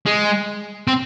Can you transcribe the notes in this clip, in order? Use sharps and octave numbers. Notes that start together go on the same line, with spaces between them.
G#3
C4